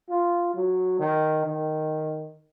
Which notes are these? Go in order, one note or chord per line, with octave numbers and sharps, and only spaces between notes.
F4
F#3
D#3
D#3